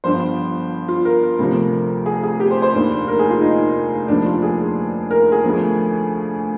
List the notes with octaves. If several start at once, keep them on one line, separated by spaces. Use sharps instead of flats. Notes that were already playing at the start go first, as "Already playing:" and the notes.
G1 G2 F3 C5
F4
A#4
D2 C3 F3
G#4
G#4
G4
C5
C5
F1 D#2 D3
A#4
G#4
F4
D#4
F1 D#2 D3 F3 D4
F4
G#4
A#4
G#4
D2 D3 F3